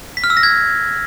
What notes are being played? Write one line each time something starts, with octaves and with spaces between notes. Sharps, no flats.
B6
F6
E6
A#6
G#6